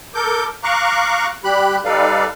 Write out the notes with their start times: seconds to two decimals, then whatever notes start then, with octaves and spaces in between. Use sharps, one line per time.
0.15 A4 A#4 D6 G6
0.63 F5 A#5 C#6 D6 F#6
1.44 G3 G4 B5 F#6
1.85 G3 D#4 A4 B4 D5 F5